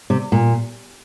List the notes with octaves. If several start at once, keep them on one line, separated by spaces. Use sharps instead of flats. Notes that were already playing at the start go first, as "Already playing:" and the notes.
C3
A#2